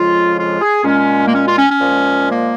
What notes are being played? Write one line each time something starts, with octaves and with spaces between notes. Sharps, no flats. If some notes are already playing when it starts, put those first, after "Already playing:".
Already playing: F2 C#3 F3 G#3 F4
F4
G#4
A#2 G#3 C#4
A#3
C#4
F4
C#4
C#4
A#2 F3 G#3
A#3